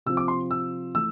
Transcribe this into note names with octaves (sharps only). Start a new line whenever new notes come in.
C3 F3 C4 E6
D6
C6
E6
E3 A3 E6